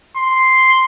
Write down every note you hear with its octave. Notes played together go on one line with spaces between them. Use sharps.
C6